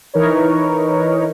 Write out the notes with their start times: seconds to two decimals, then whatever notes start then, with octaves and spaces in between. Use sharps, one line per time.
0.14 E3 D#4 A#4 B4 C#5